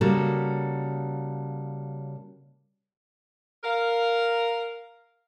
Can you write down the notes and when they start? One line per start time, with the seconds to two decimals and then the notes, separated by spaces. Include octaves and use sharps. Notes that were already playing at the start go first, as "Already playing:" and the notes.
0.01 C#3 G3 A#3 F#4 A4
3.63 A#4 F5